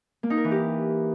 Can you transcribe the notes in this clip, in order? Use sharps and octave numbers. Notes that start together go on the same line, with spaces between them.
A#3
D#4
A#4
E3
G4